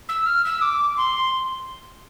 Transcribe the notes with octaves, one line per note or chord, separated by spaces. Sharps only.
E6
F6
E6
D6
C6